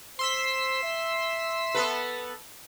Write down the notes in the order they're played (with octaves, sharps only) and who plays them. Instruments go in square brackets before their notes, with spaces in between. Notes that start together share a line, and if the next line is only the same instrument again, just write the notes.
[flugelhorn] C5 [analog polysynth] C6 E6 B6
[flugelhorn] E5
[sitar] B3 A4 B4